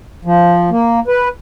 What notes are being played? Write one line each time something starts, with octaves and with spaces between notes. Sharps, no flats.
F3
A#3
B4